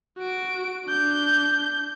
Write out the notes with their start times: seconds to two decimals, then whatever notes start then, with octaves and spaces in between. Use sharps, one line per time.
0.18 F#4 D7
0.86 D4 G6